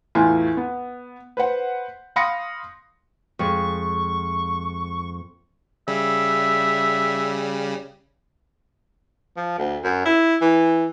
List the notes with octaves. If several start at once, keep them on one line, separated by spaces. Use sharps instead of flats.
E2 A2 F4 G#5 C6
B3
B4 C5 F#5
F5 B5 C6 D#6 A#6 C#7
F2 G#3 C#6
C#3 G3 E5
F3
D2
F#2
E4
E3